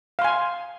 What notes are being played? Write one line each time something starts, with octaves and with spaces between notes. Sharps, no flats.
F5 G#5 C6